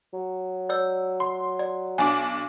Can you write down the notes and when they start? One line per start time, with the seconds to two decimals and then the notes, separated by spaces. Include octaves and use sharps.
0.13 F#3
0.69 C#5 D5 E6
1.20 C6
1.59 D5
1.98 B1 D4 G#5 D6